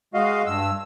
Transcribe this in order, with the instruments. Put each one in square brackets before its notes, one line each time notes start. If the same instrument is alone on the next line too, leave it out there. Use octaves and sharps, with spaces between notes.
[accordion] G#3 F#4 D#5 F5
G2 E6